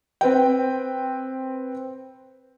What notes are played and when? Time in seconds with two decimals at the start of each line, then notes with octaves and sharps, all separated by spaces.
0.21 C4 B4 G5